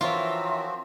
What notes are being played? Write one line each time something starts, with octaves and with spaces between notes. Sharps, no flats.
E3 F3 C4 F4 F#4 A#4 C#5 E5